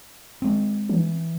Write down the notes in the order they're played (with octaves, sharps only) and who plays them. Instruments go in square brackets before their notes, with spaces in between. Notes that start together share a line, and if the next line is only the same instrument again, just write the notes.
[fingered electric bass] G#3 C4
[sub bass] E3